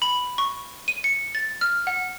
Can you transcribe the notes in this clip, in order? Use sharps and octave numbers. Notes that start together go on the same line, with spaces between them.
B5
C#6
D#7
C#7
A6
F6
F#5